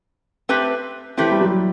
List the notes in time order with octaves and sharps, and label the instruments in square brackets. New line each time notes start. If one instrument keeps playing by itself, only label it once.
[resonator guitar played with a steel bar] A3 C4 G4 B4
[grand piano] E3 [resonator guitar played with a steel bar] A3 C4 G4 B4
[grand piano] G3
F#3